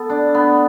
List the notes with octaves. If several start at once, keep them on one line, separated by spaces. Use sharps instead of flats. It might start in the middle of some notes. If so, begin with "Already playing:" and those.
Already playing: B3 A4
D4
B3